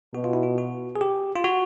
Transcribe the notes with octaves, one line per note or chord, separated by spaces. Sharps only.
B2 F#4
F4
E4
F4
F#4
G#4
G4
F4
F#4